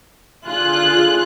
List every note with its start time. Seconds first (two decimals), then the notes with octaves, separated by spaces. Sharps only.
0.48 D3 F4 G#4 F#6